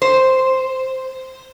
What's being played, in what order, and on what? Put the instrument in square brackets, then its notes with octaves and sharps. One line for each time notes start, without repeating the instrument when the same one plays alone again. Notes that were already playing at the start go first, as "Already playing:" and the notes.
[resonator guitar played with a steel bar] C5